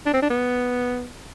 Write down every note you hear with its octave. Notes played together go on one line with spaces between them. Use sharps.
D4
C4
D4
B3